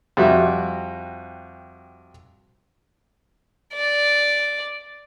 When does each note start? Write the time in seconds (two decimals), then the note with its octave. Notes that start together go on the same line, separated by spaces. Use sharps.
0.17 F2 G3 F#4 E5
3.74 D5